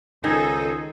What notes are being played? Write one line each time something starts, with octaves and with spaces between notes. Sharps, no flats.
C#2 D#3 D#4 A4 C5 D#5 G#5